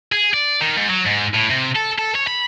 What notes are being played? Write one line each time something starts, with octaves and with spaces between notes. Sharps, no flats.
G#4
D5
D#3
G#2
F#3
G#2
A2
C3
A4
A4
C#5
B5